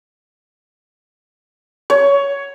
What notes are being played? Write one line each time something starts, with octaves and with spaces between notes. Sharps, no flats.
C#5